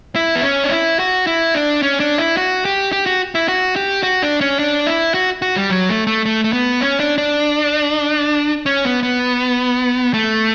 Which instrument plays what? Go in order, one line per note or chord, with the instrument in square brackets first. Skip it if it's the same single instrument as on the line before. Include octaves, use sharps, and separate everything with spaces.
[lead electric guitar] E4
B3
C#4
D4
E4
F#4
E4
D4
C#4
D4
E4
F#4
G4
G4
F#4
E4
F#4
G4
F#4
D4
C#4
D4
E4
F#4
F#4
G3
F#3
A3
A3
A3
A3
B3
C#4
D4
D4
C#4
B3
B3
A3